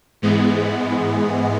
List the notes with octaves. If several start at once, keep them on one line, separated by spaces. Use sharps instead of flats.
G#2 E3 G#3 B3